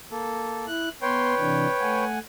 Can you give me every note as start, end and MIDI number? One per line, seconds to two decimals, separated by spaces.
0.11 0.66 58
0.11 0.66 69
0.67 0.89 64
0.67 0.89 90
1.02 1.34 59
1.02 2.04 71
1.02 2.04 73
1.02 2.04 79
1.02 1.34 84
1.38 1.67 48
1.38 1.67 52
1.38 1.67 62
1.79 2.19 57
1.79 2.19 78
1.79 2.19 80